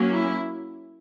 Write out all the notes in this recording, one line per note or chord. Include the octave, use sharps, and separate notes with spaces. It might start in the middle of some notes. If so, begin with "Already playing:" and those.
Already playing: F#3 A#3 C#4
E4